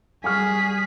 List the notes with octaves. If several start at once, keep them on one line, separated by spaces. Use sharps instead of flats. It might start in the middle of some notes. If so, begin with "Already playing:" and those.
G3 G#4 G#5 C#6 F6 B6